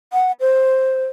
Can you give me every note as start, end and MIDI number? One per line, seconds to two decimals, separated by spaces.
0.13 0.32 78
0.40 1.05 72